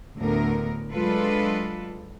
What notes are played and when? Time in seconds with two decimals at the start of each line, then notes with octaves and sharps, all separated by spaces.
0.17 D2 A2 D3 B3 A#4
0.92 F#3 G#3 D4 F4 A4 B4